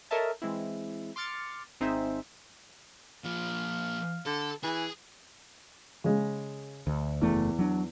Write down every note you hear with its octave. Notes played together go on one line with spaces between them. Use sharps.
A4 A#4 C#5 D#5 E5 A5
E3 G#3 C4 E4
C6 D6 F6 A6 C#7
G#1 C4 D#4 G#4 C5 E5
A#2 F3 F5
D3 A4
E3 G#4
C#3 G#3
D2
F#1 E2 A3
F#3 D4